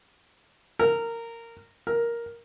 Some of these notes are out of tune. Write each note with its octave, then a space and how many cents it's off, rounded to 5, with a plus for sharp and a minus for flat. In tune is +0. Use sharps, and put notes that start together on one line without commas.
A#4 -15
A#4 +5